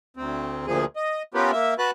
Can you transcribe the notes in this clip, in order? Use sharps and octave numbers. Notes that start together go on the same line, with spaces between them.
D2 C4
D2 A#2 F3 G#4
D#5
B3 C#4 F4 G4 A#4 B4
A#3 E5
F#4 B4 A5 F#6